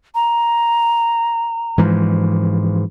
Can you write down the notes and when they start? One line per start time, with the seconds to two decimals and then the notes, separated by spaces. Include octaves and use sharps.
0.15 A#5
1.78 G#2 E3 F3